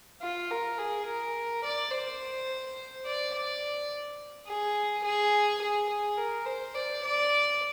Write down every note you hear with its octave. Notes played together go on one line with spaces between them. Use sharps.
F4
A#4
G#4
A#4
D5
C5
D5
D5
G#4
G#4
G#4
G#4
A#4
C5
D5
D5